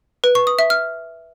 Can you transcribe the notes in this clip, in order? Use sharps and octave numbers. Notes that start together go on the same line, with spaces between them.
B4
C#6
D#6
E5
F6